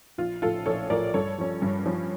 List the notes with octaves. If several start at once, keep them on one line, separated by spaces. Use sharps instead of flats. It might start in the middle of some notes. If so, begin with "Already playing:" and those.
A#1 F4
A2 F3 F4 A4
A#1 A4 C#5
A2 F3 A#4 D5
G2 A4 C#5
F3 C#4
G2
F3 C#4